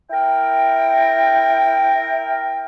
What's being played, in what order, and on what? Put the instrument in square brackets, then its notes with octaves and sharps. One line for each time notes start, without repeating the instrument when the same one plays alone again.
[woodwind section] E4 A#4 G5